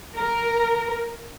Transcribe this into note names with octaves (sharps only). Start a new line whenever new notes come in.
A#4